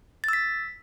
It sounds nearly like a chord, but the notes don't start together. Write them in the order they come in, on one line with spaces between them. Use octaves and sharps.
A6 E6 B6